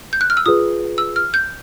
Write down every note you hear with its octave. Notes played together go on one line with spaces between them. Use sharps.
G6
F#6
F6
E6
F4 G#4 B4 D#6
E6
F6
G6